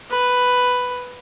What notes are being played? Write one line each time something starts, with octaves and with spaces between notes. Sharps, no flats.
B4